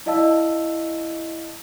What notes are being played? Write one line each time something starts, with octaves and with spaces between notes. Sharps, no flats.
E4 D5 D#5 F5 A5 E6